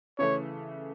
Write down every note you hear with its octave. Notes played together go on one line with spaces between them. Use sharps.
C#3 E3 A3 C#5